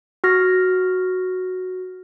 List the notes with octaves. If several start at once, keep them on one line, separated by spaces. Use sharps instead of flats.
F#4 F6 A#6